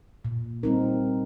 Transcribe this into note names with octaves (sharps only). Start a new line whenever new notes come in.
A#2
G3 C4 D#4 A#4